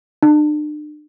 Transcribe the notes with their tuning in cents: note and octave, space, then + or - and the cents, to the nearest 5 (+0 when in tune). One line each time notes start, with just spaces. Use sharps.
D4 +40